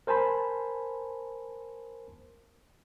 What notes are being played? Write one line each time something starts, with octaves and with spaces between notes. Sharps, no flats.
A#4 C5 G#5 A5 B5 C6